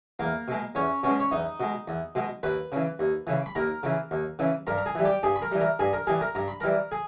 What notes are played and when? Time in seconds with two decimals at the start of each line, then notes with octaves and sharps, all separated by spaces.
0.20 E2 A#3 A#4
0.48 B2 G#3
0.75 E2 C#4 C#5
1.03 B2 G#3 C#4 C#5
1.20 C#5
1.31 E2 D#4 D#5
1.60 B2 G#3
1.88 E2
2.15 B2 G#3
2.43 D#2 B4 B5
2.72 C#3 E3
2.99 D#2
3.27 C#3 E3
3.46 B5
3.55 D#2 A#4 A#5
3.83 C#3 E3
4.11 D#2
4.39 C#3 E3
4.67 G2 A#4 A#5
4.78 A#5
4.86 G#4 G#5
4.95 E3 G3
5.05 G4 G5
5.23 G2 G#4 G#5
5.36 B5
5.42 A#4 A#5
5.52 E3 G3
5.60 A#4 A#5
5.79 G2 G#4 G#5
5.93 A#4 A#5
6.07 E3 G3 G#4 G#5
6.21 A#4 A#5
6.35 G2 A#5
6.48 B5
6.60 E3 G3 A#4 A#5
6.91 G#4 G#5